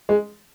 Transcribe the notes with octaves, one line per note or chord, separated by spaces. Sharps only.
G#3